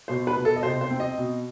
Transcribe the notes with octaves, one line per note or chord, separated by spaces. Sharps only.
B2 C5
B4
B2
A4
D#5
C3 C5
C5
C4
D#5
B2